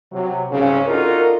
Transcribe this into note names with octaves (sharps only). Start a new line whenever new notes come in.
C3 F#3
C2 G#2 C#3
D4 D#4 F4 F#4 A4 A#4